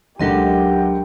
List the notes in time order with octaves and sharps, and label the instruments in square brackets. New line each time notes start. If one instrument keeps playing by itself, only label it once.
[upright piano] F#1 D3 [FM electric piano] C#2 G#3 [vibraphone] F#3 A#4 D#5 [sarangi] G4